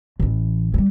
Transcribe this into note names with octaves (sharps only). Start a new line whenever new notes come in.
A1 E3
F#3 G3